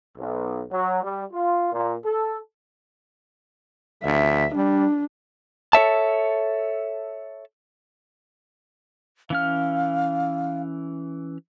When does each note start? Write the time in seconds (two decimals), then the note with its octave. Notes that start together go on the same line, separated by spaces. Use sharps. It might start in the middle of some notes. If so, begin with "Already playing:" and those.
0.18 B1
0.72 F#3
1.03 G3
1.33 F4
1.73 A#2
2.06 A4
4.04 D2 E5
4.55 G3 D4
5.73 A4 C#5 E5 A5
9.30 E3 C#4 F5 F6